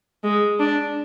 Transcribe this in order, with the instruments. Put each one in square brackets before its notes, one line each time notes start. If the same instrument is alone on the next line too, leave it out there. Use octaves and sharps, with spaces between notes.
[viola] G#3
D4